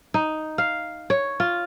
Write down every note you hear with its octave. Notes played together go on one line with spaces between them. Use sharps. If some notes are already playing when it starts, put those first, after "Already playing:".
D#4
F5
C#5
F4